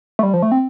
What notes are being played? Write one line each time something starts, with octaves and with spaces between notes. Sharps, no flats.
A3
G3
F3
A3
C4